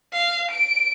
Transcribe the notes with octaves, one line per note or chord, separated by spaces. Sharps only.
F5
D7